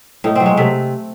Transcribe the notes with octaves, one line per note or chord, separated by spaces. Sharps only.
A2 D#4
F#3 C4
G#3
C3 A3